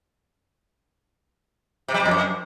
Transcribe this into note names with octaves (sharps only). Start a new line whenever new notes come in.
C3
G3
C3
F2
F#2